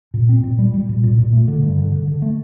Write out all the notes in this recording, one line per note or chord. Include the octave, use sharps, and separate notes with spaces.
A#2
C4
A#2
G3
G3
A#2
A#2
A#2
A3
D3
G2
D3
D3
D3
A3